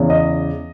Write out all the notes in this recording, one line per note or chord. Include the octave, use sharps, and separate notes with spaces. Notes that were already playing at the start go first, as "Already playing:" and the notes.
Already playing: E2 C#3 E3
D#5